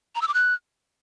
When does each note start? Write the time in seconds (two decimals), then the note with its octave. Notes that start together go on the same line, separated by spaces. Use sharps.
0.15 A#5
0.22 E6
0.28 D6
0.34 F#6